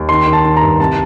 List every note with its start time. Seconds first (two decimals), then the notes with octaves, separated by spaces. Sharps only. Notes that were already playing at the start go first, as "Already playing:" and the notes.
Already playing: D#2
0.09 D#3 C6
0.27 D#3
0.33 A5
0.45 D#3
0.57 A#5
0.62 G2
0.80 C2 A5